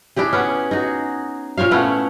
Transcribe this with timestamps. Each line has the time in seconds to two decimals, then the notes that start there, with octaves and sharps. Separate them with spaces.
0.16 D4 E4 G4 G#4
0.33 B3 C#4
0.71 D#4 F#4 G#4
1.58 A#2 C5 C#5 F5
1.71 A3 B3 C#4 E4